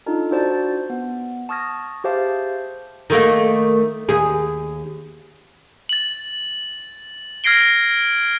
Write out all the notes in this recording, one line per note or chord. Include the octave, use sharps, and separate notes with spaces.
D4 D#4 F4 A4
D4 F#4 C5 D5 A5
B3
A5 C#6 D#6 F6 G#6 A#6
G4 G#4 C5 E5 F5 A5
D#3 A3 A#3
D#2 G#4
A6 F#7
F6 G#6 A#6 C7 D7 G7